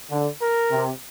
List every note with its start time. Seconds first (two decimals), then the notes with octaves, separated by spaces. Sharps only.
0.11 D3
0.41 A#4
0.72 C3